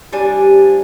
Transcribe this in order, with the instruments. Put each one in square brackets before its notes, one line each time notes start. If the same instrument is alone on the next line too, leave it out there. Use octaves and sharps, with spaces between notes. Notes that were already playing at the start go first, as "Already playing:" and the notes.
[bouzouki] F3 G3 D4 G#5